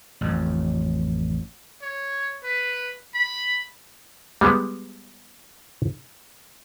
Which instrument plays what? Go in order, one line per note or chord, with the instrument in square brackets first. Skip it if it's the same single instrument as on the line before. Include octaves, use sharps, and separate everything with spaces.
[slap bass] A1 F2
[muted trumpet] C#5
B4
B5
[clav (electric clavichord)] G3 G#3 B3